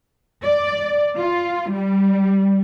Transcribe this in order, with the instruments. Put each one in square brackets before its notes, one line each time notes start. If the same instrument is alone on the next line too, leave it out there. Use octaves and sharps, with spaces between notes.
[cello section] D5
F4
G3